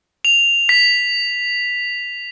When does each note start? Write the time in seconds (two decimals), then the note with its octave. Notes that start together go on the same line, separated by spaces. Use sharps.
0.25 F7
0.69 B6